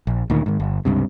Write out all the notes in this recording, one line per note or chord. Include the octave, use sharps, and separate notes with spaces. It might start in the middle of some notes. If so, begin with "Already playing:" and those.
A#1
D2 A#2 D#3
G#2 D#3
G1
C#2 G2 C3